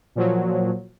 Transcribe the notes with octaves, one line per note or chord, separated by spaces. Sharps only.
A#2 F3 F#3